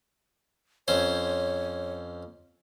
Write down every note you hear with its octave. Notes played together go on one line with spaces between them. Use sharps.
F2 C#4 C5 C#5